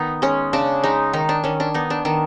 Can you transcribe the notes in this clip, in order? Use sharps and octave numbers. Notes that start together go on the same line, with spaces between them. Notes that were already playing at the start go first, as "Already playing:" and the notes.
Already playing: D#3 B3 D#4
G#3 C#4
C#3 D4
G#3 D#4
D#3 D#4
D4
D#3 C#4
D4
B3 D#4
D4
D#3 D4